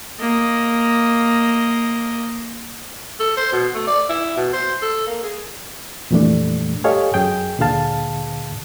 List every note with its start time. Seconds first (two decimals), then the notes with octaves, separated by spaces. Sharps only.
0.20 A#3 D#5
3.20 A4
3.37 C5
3.52 B2
3.74 A3
3.87 D5
4.09 E4
4.37 B2
4.53 C5
4.82 A4
5.07 A#3
5.23 G#4
6.11 F2 A#2 E3 G3 A3 D4
6.84 G4 A4 C#5 D#5 F5 G#5
7.14 F#2 G#4 G5
7.59 D2 A#2 D3 G#4 F5 A5